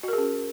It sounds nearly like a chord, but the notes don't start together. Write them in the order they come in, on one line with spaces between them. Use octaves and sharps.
F#4 A#4 G#4 C#4